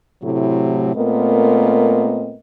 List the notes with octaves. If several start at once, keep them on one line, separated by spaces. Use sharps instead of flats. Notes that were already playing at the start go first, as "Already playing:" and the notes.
A2 C3 F#3 A3 E4
A#2 A3 B3 C4 A#4 D#5